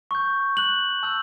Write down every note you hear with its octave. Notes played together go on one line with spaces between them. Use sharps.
C#6 G6
C#6 F#6 F#7
A5 E6 G6